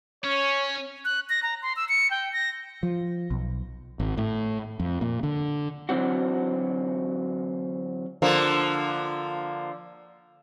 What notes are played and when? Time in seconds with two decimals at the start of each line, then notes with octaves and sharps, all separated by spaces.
0.24 C#4 C#5
1.05 F#6
1.30 A#6
1.43 A#5
1.62 C6
1.76 E6
1.89 C#7
2.11 G5
2.33 A#6
2.83 F3
3.30 B1
4.00 G#1
4.17 A2
4.80 F2
5.01 A#2
5.23 D3
5.89 D3 E3 F#3 C4 F#4
8.22 D3 F3 A#3